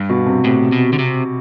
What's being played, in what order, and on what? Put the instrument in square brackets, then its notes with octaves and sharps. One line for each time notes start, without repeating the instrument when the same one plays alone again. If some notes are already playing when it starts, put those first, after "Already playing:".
Already playing: [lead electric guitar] G2
[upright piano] B2
C3
[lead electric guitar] A2 [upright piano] C3
[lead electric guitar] B2
D3
C3